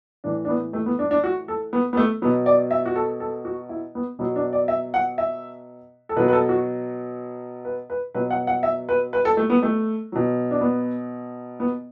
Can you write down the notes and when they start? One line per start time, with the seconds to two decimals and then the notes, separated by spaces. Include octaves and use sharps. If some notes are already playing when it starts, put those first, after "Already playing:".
0.24 A2 E3 D4
0.45 D4
0.49 B3
0.73 A3
0.86 B3
0.99 D4
1.11 D4
1.24 F#4
1.48 A4
1.73 B3
1.93 B3
1.97 A3
2.22 F#3 B3
2.25 B2
2.46 D5
2.71 E5
2.86 F#4
2.96 A4
3.20 A4
3.45 F#4
3.69 E4
3.95 B3
4.19 B2 F#3 B3
4.36 D4
4.53 D5
4.68 E5
4.94 F#5
5.18 E5
6.09 A4
6.16 B2 B4
6.19 F#3
6.28 B4
6.33 A4
6.49 F#4
7.65 B4
7.90 B4
8.14 B2 F#3 B4
8.30 F#5
8.47 F#5
8.63 E5
8.89 B4
9.13 B4
9.25 A4
9.37 A3
9.50 B3
9.63 A3
10.12 B2 F#3
10.51 D4
10.61 B3
11.60 B3